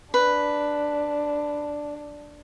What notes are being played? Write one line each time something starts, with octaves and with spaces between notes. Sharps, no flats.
D4 B4